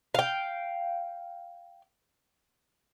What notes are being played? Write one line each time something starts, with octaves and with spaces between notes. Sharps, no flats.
F5 G5